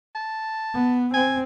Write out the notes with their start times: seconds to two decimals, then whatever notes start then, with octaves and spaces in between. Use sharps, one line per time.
0.15 A5
0.74 B3
1.14 C4 G#5